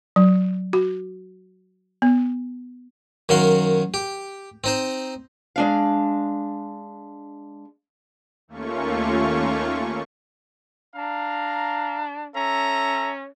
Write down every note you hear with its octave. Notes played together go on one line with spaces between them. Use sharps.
F#3
F#4
B3
F#2 D#3 F#4 F5 C6
G4
C4 D#4 C5
G#3 D4 F5
D#2 A3 A#3 C#4 F4 C#6
D4 F5 A#5
C#4 A4 E5 A#5